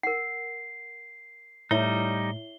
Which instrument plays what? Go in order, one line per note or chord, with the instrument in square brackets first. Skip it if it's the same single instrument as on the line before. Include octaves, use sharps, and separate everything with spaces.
[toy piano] A#4 F#5 [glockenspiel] C7
[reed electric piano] A2 [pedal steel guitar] G3 D#4 [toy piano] E4 C#5 E5 [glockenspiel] G7